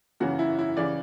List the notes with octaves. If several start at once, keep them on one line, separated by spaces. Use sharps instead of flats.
F#2 C#3 E3 F#4
E4
E4
C#3 E3 D5